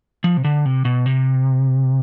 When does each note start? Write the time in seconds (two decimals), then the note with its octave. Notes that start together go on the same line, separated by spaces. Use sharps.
0.24 F3
0.37 C3
0.44 D3
0.65 C3
0.85 B2
1.06 C3